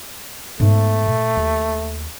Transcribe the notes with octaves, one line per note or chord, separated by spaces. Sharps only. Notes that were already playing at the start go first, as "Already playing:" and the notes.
G#2 A3 B3
A#2
D#2